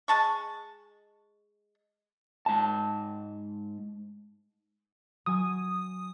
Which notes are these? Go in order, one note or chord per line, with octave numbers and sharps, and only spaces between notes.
G#3 A5 C#6
G#2 A5
F#3 G#5 D#6